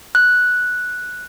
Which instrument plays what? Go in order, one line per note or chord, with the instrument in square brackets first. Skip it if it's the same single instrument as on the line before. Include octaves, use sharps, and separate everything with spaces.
[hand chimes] F#6